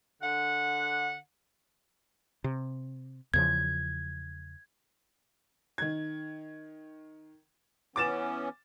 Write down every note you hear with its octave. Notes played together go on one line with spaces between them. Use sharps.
D3 F#5
C3
E2 C#3 F3 G#6
D#3 G#6
E3 B3 C#4 D6 A6 E7